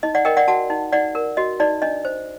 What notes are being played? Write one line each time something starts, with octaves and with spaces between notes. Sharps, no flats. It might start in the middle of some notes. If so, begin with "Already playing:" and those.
D#4 D#5
D5 F#5
A#4 D#5 G5
D5 F#5
F#4 F#5 A5
D#4
D#4 D5 F#5
A#4
F#4 D#5
D#4 D5
D4 D#5
C5